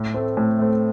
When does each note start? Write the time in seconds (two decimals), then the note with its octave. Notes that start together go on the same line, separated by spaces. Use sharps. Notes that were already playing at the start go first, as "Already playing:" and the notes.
Already playing: A2
0.14 A3 C4
0.37 A2
0.59 A3 C4